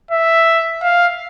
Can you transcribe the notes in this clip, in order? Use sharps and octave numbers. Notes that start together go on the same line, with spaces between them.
E5
F5